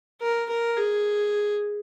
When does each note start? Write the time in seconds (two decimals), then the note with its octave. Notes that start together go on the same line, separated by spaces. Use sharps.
0.21 A#4
0.49 A#4
0.77 G#4